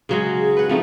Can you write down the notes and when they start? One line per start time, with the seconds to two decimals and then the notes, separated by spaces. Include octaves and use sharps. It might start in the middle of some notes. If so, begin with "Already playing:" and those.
0.09 C#3 F#3 G#3
0.38 G#4
0.57 B4 F#5
0.69 F3 A3 C4 D#4